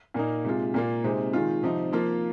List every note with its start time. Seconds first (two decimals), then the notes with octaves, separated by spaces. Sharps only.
0.14 A#2 A#3 D#4
0.44 C3 G#3 F4
0.74 A#2 A#3 F4
1.04 C3 G#3 C4 D#4
1.33 D#3 G#3 F4
1.63 C3 F3 C4 D#4
1.92 F3 A#3 F4